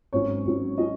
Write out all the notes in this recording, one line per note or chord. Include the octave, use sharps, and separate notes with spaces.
G#1 G#2 F#3 C#4 C#5
G#1 G#2 F#3 C#4
F#3 C#4 D#5